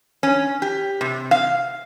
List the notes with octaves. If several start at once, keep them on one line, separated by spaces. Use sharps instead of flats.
C#4
G4
C3
F5